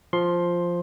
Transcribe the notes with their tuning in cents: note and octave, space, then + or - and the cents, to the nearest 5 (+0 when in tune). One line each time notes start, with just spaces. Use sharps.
F3 +0 C6 +10